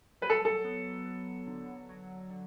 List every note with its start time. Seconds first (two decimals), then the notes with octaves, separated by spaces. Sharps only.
0.22 F#3 B4
0.30 A4
0.45 A4
0.64 B3
1.06 B3
1.47 D3
1.89 F#3
2.30 D3